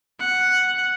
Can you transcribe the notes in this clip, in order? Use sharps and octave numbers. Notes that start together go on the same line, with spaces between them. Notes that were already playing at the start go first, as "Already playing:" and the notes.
F#5